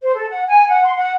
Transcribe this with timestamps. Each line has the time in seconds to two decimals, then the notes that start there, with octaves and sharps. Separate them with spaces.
0.02 C5
0.15 A4
0.29 F#5
0.48 G#5
0.67 F#5
0.84 C6
0.96 F#5